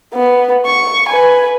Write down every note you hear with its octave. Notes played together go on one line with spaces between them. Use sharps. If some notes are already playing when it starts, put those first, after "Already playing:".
B3
C#6
B4 G#5